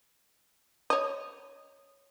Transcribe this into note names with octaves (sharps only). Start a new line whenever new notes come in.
C#5 D#5